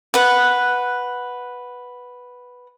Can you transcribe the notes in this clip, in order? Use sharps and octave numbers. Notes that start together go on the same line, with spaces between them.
B4 F#5